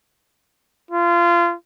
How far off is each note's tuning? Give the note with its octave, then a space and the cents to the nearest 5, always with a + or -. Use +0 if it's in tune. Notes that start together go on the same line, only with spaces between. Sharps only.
F4 -25